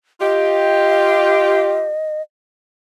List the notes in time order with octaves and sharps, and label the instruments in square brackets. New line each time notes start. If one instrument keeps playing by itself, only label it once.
[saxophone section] F4 G4 [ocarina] D#5